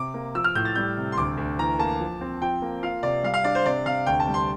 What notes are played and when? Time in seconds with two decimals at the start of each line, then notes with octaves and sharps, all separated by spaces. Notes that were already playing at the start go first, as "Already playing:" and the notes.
Already playing: C3 D6
0.14 A#3
0.35 F3 E6
0.44 F6
0.55 A2 G6
0.65 A6
0.75 G3 G6
0.97 C3
1.12 C6
1.17 D2 D6
1.37 D2
1.58 E3 A#5
1.79 A#3 A5
2.00 F3
2.21 C4
2.42 F3 G5
2.62 A#3
2.82 F4 F5
3.03 C3 D5
3.23 G3 F5
3.34 F5
3.44 D4 D5
3.55 C5
3.65 C3 D5
3.85 C3 F5
4.06 D2 G5
4.20 A5
4.27 G3
4.34 C6